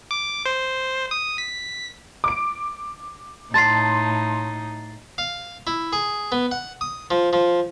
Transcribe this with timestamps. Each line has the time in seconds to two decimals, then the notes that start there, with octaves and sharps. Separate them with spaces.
0.11 D6
0.46 C5
1.11 D#6
1.38 B6
2.24 D6 D7
3.54 A2 D#4 A5 C6 A6 C7
5.18 F5
5.67 E4
5.93 G#4
6.32 B3
6.51 F#5
6.81 D#6
7.10 F3
7.33 F3